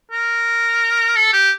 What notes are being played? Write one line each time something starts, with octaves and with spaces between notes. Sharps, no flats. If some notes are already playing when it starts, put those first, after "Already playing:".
A#4
A4
G4